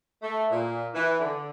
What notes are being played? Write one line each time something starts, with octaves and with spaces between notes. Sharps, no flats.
A3
A#2
E3
D3